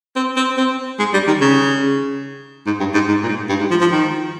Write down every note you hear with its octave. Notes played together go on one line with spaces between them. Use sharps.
C4
C4
C4
G#3
G3
D#3
C#3
G#2
G2
G#2
G#2
A#2
G#2
G2
G#2
F3
F3
D#3